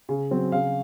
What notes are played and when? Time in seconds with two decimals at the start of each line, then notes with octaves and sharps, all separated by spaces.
0.09 C#3
0.31 F#3 C4
0.52 C#3 F5